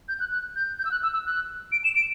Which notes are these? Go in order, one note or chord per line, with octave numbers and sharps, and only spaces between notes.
G6
F#6
F#6
G6
G6
E6
F#6
E6
E6
F#6
D7
E7
D7